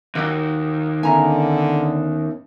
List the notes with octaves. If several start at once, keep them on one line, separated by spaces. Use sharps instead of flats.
D#2 F#4 G4 A#4 D#5 G5
D3 B3 C#4 E5 G#5 A#5